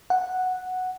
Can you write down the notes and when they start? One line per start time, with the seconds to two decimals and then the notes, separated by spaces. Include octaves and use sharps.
0.10 F#5